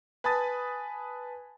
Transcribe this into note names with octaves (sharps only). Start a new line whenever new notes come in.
B4 G#5 A5 B5 D#6 A6